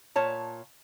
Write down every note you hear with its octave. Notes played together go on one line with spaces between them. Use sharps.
A#2 C#5 A5